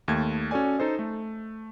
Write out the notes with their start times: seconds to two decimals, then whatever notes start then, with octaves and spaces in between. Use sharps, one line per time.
0.08 D#2 A3 G#6
0.51 C#4 F#4 A4 D5 G#5
0.79 D#4 A4 C5 D#5
0.99 A3